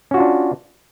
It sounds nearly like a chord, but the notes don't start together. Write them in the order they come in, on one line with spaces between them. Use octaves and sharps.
C#4 F#4 F4 D4